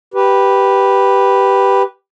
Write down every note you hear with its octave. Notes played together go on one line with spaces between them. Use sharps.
G4 B4